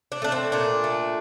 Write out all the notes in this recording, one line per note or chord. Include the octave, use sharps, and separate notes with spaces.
D4
A3 D4
C4
A#2 D4
A3